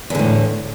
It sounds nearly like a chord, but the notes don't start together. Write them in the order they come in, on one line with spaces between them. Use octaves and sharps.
E2 D3 A2